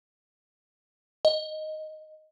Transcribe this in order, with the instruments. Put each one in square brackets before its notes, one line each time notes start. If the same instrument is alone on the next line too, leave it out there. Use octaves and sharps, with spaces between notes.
[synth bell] D#5